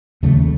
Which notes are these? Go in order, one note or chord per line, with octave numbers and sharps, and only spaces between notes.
D#2 C#3 F#3 A3